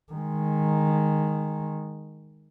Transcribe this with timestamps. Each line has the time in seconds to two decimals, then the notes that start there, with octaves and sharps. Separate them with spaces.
0.13 D#3 G#3